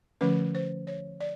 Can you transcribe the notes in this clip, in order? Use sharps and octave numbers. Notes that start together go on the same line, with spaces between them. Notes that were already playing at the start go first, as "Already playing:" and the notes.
D3 F3 A3 C#4 B4
C5
C#5
D5